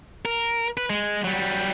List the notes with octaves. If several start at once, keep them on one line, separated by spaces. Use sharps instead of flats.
A#4
B4
G#3
F#3 G3